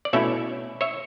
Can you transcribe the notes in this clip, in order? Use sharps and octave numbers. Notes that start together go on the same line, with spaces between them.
D5
B2 A3 C#4 E4 C#5 E5
C#5 E5